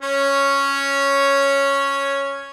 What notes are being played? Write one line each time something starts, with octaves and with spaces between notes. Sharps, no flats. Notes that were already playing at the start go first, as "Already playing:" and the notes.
C#4 C#5